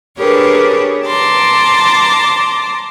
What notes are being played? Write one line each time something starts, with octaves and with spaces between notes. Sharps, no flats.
D4 G4 G#4 A#4 B4 C#5
A5 A#5 C6 D6